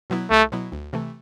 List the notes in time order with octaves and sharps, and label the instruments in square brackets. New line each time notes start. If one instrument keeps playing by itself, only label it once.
[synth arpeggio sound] B2 F#3 B3 E4
[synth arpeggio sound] C2 [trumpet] A3
[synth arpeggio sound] B2 F#3 B3 E4
D2
C3 E3 A3